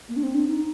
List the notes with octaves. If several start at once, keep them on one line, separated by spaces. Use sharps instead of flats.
A#3
D4
C4
D4
D#4